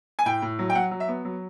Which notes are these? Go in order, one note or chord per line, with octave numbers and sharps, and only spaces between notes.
G#5
A2 G5
A2
F#3
G5
F#3 F#5
F#3
E5
B3
F#3